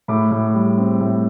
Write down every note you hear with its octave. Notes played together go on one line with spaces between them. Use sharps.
A2 B5 D6
A2
G3
C4
A2